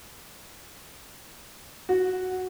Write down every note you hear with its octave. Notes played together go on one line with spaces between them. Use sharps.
F#4